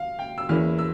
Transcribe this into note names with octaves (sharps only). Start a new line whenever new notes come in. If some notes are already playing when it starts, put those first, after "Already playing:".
Already playing: F5
G5
E6
E2 E3 A#3 C#4 E4 F6
E6